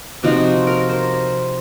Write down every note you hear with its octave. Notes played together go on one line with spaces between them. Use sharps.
C3 F3 C4 D#4 F#4
A#4
C5